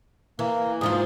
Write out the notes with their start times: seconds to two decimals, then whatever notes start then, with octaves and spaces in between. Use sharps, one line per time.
0.39 E3 A#3
0.81 G#2 F3 F4 G#4